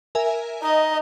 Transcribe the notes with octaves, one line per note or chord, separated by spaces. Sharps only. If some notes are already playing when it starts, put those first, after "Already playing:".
A#4 E5 G#5
D#4 D#5